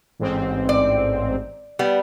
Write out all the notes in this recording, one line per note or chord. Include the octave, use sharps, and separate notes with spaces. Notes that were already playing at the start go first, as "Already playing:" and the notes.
A1 G#2 C4
D5
G3 B3